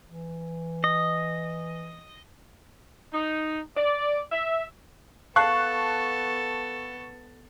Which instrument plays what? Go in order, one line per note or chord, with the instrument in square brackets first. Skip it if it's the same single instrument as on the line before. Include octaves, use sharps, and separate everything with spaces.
[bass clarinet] E3
[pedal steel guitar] D#5
[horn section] D#4
D5
E5
[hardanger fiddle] B3 A4 [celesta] F5 [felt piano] A5 F#6 C7 [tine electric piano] C#6